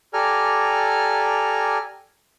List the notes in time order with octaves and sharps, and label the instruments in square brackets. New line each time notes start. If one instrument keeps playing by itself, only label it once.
[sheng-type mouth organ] G4 A4 D5 G#5 A#5 F6